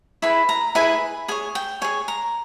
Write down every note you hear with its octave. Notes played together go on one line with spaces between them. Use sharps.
E4 G#4 B4 B5
A#5
E4 G#4 B4 G#5
G#4 C#5 G#5
G5
G#4 C#5 G#5
A#5